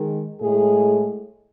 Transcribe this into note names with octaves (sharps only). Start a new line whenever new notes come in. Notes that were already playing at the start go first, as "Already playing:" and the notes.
Already playing: D#3 G#3
A2 G#3 G#4